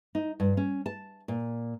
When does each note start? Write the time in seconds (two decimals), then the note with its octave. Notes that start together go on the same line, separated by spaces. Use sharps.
0.15 D#4
0.40 G2
0.57 C#4
0.86 A5
1.28 A#2